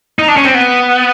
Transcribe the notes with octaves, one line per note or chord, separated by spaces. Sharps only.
D#4
D4
C#4
C4
B3